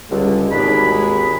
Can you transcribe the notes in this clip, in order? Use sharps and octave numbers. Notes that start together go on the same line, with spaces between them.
C#2 D3 G3
G#1 D#2 D4 G#4 B5
G#3 G#4